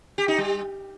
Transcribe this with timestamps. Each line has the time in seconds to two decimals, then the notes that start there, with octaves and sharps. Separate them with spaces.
0.18 G4
0.28 D#4
0.38 G3